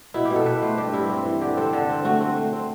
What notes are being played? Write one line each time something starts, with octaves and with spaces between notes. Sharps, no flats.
B2 E4
G4
B2
A4
B2 B4
A3 C5
G2 G4
G2 E4
C4
E3
D3 G4
C4 A4
D3 A4
C4
A3 F#4
C4 F#4
A3
C4